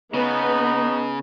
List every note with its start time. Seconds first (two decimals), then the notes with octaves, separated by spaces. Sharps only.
0.14 C#3 B3 D#4